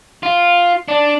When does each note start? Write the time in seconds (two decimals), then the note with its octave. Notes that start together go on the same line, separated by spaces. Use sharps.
0.23 F4
0.88 D4